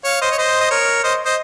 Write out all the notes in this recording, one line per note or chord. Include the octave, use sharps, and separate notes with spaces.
C#5 F5
C5 D#5
C#5
C5 D#5
D#5
A#4 C#5
C5 D#5
C5 D#5